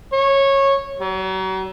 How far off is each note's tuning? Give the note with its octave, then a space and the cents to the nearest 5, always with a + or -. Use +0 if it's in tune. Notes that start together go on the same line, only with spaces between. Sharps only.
C#5 -15
F#3 +40